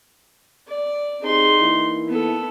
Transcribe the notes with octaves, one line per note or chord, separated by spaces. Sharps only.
D5
C4 D#4 G4 G#4 C6
E3 A#3 E4
B3 A4